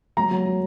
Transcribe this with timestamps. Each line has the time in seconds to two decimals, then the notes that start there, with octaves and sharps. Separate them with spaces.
0.17 F#3 A#5
0.31 F#3
0.46 F#3